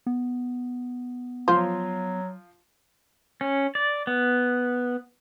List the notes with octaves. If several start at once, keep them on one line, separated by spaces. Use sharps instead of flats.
B3
F3 F#3 F4 C5
C#4
D5
B3